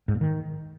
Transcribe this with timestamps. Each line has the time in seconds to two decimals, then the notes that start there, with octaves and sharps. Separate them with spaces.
0.08 G#2
0.15 A#2
0.21 D#3